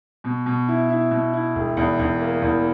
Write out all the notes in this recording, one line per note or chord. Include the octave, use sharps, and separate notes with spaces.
B2
B2
E4
E4
B2
E4
E1
E2
E2
A#3
E2